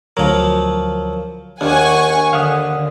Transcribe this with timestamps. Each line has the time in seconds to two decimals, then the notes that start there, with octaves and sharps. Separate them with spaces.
0.17 D2 F3 F#3 A#4
1.61 D#2 D4 F#5 G#5 C#6
2.33 D3 F5 F#5 D#6